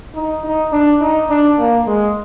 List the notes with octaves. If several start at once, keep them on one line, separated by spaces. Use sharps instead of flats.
D#4
D#4
D4
D#4
D4
A#3
G#3